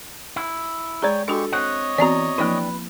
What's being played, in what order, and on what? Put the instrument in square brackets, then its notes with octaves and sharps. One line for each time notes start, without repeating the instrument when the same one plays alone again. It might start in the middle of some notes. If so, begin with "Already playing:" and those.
[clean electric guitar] E4
[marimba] G#3 A#5 [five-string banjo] G#4 D5 [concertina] C#5 G5
[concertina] G#3 G4 C#6 [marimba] D4 F#4 [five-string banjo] A4
[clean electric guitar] C4 F#5 [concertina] C#5 D#5
[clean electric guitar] E3 [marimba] B3 C4 F#4 [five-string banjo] D5 A#5
[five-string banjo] E3 D4 G5 [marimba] F3 A#3 E4 [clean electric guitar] B4